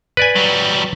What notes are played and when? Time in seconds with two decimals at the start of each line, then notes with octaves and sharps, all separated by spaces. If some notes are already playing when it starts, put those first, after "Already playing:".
0.17 B4 D5 G#5
0.36 F#3 G3